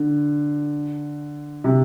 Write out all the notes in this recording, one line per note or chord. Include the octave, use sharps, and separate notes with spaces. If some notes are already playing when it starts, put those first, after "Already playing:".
Already playing: D3
C3